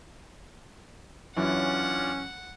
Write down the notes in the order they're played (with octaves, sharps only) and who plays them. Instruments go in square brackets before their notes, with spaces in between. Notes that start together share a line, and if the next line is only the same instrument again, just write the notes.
[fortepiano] F#2 E3 [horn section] C#4 [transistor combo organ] D4 F4 [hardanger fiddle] F#5